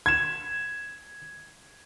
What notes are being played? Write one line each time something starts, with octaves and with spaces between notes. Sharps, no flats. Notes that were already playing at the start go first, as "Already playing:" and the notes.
G#6 E7